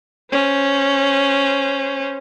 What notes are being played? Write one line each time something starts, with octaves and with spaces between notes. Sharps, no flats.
C#4 C5